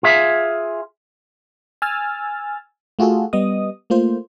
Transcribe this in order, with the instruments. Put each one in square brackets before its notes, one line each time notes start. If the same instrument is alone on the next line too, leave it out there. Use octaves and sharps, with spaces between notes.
[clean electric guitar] F4 G#4 E5
[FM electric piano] G#5 E6 F6 A6
A3 F4 F#4 G#4 A4
G3 B3 D#5 D#6
A3 A#3 F4 C5